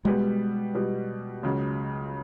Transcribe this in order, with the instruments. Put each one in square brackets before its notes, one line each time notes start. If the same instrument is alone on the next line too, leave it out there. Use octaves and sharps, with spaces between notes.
[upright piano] B2 G3 B3 [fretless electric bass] G#3
[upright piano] B2 G3 B3
C#2 C#3 F#3